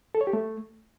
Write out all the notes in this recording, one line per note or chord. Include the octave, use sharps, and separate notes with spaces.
A4
C#5
G4
A3